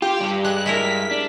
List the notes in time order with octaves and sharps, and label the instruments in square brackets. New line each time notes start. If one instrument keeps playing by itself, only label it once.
[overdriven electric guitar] F4 [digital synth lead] G4
[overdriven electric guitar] G2 G3
[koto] G#3 [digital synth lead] F#6
[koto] G#3 E4 A#4 [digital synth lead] B6
[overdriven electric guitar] D4